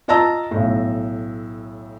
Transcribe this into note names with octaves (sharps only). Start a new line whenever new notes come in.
F4 D#5 A5 A#5 E6 A#6
B1 A2